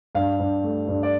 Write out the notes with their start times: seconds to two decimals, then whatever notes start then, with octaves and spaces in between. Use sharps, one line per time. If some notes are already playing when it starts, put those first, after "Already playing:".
0.15 G2 F5
0.40 G2
0.64 A3
0.88 G2
1.03 D5